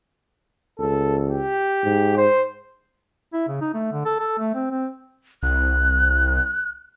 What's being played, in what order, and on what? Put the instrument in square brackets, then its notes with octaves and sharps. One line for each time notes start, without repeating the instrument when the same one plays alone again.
[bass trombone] C#2 [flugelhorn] A4
[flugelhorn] G4
[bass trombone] G#2
[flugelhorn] C5
[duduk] E4
C#3
D#4
A3
D3
A4
A4
A3
C4
C4
[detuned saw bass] C2 [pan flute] F#6